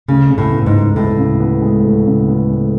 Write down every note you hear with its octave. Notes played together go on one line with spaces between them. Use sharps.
D2 C#3
C#3
A2
B3
G#2
G#3
D2 A2
C#3
B3
G#3
D2
C#3
B3
G#3